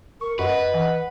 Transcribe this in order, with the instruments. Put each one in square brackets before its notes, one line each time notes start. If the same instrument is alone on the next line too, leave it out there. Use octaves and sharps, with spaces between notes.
[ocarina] A#4 [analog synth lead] C#6
[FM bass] F#2 [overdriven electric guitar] B4 [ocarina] D#5 [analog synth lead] F#5
[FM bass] E3